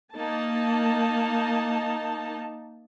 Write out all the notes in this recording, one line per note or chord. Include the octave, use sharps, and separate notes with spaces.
A#3 D#4 A5